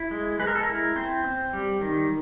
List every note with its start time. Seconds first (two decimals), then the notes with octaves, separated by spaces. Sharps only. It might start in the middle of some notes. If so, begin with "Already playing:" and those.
Already playing: E4
0.11 G#3
0.39 G#3 B4
0.47 A#4
0.55 A4
0.63 E4 A#4
0.96 C4 C5
1.24 C4
1.53 G3
1.81 D#3